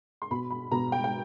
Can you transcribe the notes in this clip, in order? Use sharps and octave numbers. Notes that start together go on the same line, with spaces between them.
C6
B2 B5
B5
B2 A#5
G5
G5